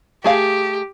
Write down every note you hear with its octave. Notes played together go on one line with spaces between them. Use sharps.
A3 G4 G#4 F5